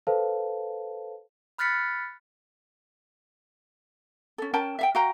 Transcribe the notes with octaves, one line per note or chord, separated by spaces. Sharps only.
A4 B4 C5 F5 A5
B5 F6 F#6 A6 B6 C#7
C#4 A4
C#4 A#4 G5 A5
E5 F5 G5
F#4 F5 G5 A#5